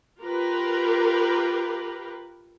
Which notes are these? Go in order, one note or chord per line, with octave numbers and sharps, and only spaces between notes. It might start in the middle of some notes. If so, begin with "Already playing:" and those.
F4 G4 A#4 B4